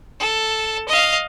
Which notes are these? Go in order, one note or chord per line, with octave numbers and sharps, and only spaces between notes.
A4
D#5 F5